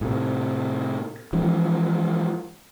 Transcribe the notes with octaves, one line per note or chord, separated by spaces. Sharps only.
A2 C3
E3 F3 G#3 C#4